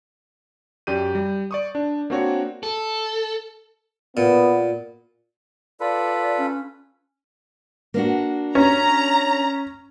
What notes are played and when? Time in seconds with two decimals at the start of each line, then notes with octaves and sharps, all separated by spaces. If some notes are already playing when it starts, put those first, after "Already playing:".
0.87 F#2 G4 D5 G6 D#7
1.15 G3
1.51 D5 C#6 D#6
1.75 D4
2.10 A#3 C4 D4 F#4 C#5
2.63 A4
4.17 A#2 B3
5.80 F4 A4 B4 D5
6.38 C#4
7.94 A#3 D4 F#4
8.55 C#4 A#5